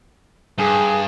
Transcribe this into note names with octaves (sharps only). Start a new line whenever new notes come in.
G2 G#4